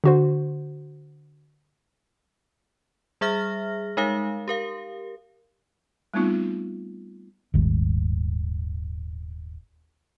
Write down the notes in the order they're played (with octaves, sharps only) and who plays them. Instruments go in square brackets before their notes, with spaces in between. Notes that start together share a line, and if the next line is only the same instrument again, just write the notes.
[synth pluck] D3 F#4 C5
[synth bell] G3 G#4 E5 F6 A#6
G#3 D#4 A#4 F5
G4 A#4 F5
[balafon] G3 A3 B3 C4 D#4 F4
[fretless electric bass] D#1 G#1